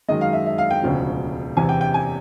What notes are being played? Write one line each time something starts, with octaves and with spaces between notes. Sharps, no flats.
F#2 D#3 G#3 D#5
F5
E5
E5
F5
G5
E1 D2 C#3 F3
E2 C3 E3 G#5
G5
G5
G#5